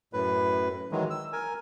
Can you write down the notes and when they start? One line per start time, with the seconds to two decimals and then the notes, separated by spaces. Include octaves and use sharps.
0.13 F#2 A2 B4
0.92 D#3 E3 F#3 G#3
1.10 E6
1.33 A#4 G#5